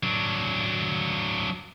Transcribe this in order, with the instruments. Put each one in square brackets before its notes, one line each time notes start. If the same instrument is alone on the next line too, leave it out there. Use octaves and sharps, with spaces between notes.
[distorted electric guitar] F#3 D4